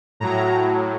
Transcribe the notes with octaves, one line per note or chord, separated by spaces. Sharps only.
A2 F#3 A#5